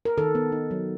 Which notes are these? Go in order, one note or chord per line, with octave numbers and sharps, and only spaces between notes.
A#4
D#3 A4
B3
D#4
F#3